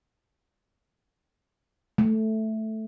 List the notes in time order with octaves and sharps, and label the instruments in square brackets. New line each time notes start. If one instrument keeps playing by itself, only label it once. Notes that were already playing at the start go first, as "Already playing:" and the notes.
[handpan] A3